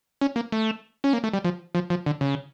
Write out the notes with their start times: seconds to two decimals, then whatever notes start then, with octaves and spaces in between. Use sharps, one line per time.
0.21 C#4
0.36 A#3
0.52 A3
1.04 C#4
1.13 A#3
1.24 A3
1.33 G3
1.45 F3
1.75 F3
1.90 F3
2.06 D3
2.21 C#3